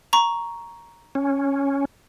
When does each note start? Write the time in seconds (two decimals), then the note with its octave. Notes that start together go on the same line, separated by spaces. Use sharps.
0.13 A#5 C#6
1.15 C#4